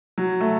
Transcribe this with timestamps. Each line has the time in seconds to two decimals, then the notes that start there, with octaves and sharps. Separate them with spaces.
0.18 F#3
0.41 A3